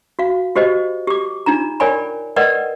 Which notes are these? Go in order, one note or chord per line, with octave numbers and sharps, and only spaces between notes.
F#4 F5
F#4 G4 C5 D#5
G4 D6
D4 D#4 F4 A#5
A#4 C#5 D5 G5 G#5 B5
A#4 B4 D5 D#5 F#5 G5